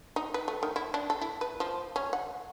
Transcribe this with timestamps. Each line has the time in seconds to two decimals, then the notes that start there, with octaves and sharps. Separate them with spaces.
0.16 D#4
0.34 B4
0.48 A3
0.63 D#3
0.76 E4
0.94 D4
1.10 A4
1.21 E4
1.41 B4
1.60 F3
1.96 C#4
2.13 F#5